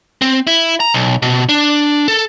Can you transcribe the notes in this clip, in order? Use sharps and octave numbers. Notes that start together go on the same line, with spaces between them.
C4
E4
A#5
B1
B2
D4
A4